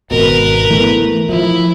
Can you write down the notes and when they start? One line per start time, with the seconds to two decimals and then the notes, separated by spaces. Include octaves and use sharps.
0.11 G#1 B2 A#4 B4
0.70 E3 A3 B3
1.29 F3 E4